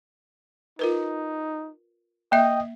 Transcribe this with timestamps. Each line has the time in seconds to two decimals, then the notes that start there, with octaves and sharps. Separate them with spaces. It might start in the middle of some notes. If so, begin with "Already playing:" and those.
0.79 D#4 F4 A#4 B4
2.32 A#3 D#5 E5 G5